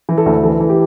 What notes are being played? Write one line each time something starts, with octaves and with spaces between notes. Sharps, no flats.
E3
A4
D2
E3 A4
E3
G4